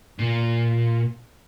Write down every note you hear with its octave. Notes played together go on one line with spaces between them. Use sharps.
A#2